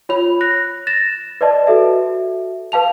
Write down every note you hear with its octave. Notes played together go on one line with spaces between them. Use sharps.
F4 C#5 B5 F7
F#6 A#6
A6 A#6 E7
B4 D5 D#5 A5
F#4 A4 E5
B4 F5 A5 F7